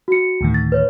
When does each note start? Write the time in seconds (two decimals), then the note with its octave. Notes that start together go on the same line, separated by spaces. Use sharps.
0.08 F#4 C#7
0.41 D2 A2 D#3
0.54 A6
0.72 B4 C#5